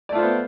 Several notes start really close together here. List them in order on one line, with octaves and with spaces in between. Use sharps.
D5 A3 F4 C5 B3